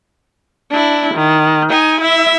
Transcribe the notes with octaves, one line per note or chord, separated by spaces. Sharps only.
D4 E4
D#3
D#4 G#5
E4 E5